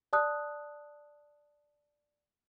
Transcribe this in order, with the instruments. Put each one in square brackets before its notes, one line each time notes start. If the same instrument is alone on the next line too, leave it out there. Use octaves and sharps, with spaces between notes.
[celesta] D5 A5 D#6 F#6